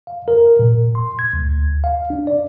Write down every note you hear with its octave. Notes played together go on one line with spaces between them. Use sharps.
F5
A#4
A#2
C6
G#6
D2
F5
D4
D5